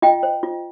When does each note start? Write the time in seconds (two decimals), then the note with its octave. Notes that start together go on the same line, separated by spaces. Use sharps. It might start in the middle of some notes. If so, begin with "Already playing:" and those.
0.02 F4 D#5 G5
0.23 C5
0.43 F4